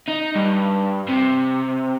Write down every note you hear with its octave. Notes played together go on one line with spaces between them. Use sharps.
D#4
G2
C3